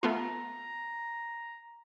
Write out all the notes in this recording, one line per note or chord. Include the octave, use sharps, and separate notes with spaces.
A3 B3 F4 A#5